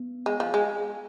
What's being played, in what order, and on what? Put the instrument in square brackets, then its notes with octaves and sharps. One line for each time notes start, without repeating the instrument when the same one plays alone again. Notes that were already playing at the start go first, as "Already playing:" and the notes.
Already playing: [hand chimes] B3
[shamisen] G#3
F3
G#3